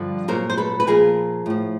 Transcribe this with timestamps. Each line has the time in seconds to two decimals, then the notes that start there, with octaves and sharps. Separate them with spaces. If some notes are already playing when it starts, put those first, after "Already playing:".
Already playing: G2 D3 F3
0.28 A#2 F#3 A#4 C5
0.50 C5
0.57 A4 B4
0.80 B4
0.87 A#2 F3 G#4 A#4
1.46 A2 F3